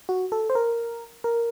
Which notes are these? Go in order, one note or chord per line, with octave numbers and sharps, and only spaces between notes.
F#4
A4
C5
A#4
A#4